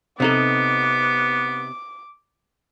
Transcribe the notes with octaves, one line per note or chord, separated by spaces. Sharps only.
C3 B3 D#4 A4 D6